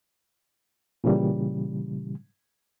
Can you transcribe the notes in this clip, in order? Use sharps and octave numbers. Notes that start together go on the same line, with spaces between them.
A#2 C#3 E3 G3